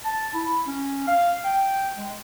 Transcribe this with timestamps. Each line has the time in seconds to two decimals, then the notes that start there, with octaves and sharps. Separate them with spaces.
0.05 A5
0.33 E4
0.67 C#4
1.07 F5
1.44 G5
1.97 G#3